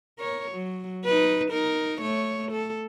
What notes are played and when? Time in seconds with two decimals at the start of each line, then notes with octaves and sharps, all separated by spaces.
0.19 A#4 C#5
0.52 F#3
1.04 D#4 B4
1.50 D#4 A#4
2.01 A3 C#5
2.52 A4